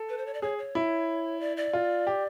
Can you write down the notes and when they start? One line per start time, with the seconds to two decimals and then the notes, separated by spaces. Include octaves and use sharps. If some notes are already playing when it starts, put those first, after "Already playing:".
Already playing: A4
0.09 B4
0.18 C5
0.26 C#5
0.34 D5
0.42 G#4 C#5
0.58 C#5
0.75 E4
1.40 D5
1.57 D5
1.73 F4
2.07 G4